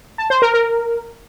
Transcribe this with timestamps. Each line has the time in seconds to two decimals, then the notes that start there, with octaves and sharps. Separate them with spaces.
0.18 A5
0.30 C5
0.42 A#4
0.54 A#4